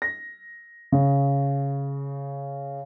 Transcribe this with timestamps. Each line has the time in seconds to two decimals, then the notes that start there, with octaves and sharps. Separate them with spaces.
0.02 A#6
0.92 C#3